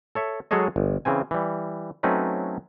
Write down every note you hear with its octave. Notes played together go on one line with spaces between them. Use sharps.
A4 C#5 E5
F#3 G#3 G#4 A4 C#5 D#5
G1
C#3 E3 C4 G#5
E3 G3
F#3 A3 C4 C#4 D#4 B4